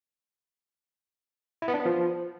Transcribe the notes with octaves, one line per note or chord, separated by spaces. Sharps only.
E4
B3
D4
B3
F3